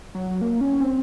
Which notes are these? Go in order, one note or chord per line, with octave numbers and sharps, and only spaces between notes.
F#3
A#3
C#4
C4